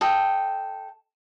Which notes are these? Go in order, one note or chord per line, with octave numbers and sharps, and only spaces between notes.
A4 D#5 G5